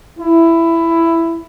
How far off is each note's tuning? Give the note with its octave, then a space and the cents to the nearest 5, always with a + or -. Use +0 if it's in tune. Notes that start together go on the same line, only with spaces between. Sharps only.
E4 +10